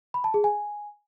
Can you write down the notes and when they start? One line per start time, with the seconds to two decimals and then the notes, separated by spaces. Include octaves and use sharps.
0.14 B5
0.24 A5
0.34 G#4
0.44 G#5